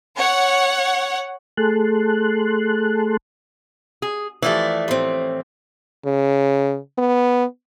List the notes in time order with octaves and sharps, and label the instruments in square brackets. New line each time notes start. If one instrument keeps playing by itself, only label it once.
[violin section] C#5 F#5
[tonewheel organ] A3 G#4 A4 A5 C6 F#6
[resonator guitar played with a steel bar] G#4
[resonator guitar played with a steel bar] E3 F3 A3 [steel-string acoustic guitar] G4 D5
[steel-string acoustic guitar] A2 C4
[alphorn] C#3
B3